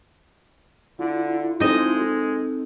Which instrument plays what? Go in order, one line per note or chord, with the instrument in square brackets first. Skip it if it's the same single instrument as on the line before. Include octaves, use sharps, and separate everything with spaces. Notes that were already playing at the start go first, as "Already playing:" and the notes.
[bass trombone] D3 [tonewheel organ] E4 F4
[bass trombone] G#3 [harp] C4 A4 C5 [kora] D#4 D#5